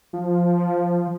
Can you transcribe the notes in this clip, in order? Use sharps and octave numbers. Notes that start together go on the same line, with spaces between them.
F3